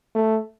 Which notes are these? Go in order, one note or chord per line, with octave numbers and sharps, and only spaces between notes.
A3